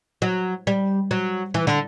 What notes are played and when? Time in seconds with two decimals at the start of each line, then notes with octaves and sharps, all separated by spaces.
0.22 F#3
0.67 G3
1.11 F#3
1.54 E3
1.67 D3